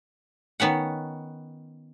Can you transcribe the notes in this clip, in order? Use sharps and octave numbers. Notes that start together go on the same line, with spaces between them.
D#3 B3 C#4 F#5